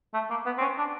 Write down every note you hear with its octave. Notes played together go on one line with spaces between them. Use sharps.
A3
A#3
B3
C4
C#4
D4